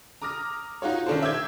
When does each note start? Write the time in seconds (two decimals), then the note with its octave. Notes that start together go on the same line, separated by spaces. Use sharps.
0.22 A#5 D6 D#6 F6 A#6
0.82 D#4 F4 F#4 C#5
1.07 D#3 C#4 D4 A4 A#4 C5
1.22 E5 D6 G6 G#6